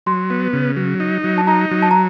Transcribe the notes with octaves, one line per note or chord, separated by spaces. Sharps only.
F#3 C6
B3
C#3
F#3
D#4
F#3
A5
D#4 A#5
F#3
A5
A#5